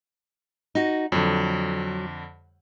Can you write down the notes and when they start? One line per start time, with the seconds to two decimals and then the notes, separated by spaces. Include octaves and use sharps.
0.75 D#4 F#4
1.12 F2 D3 F#3